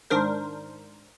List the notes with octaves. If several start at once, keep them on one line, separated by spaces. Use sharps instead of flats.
G#2 D#3 D4 A#4 C5